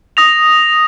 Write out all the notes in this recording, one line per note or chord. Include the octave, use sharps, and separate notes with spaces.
D#6 A#6 F7